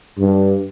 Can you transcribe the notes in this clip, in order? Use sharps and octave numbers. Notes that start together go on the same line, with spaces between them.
G2